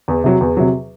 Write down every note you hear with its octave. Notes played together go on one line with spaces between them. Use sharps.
E2
C3 F#3
E2
C3 F#3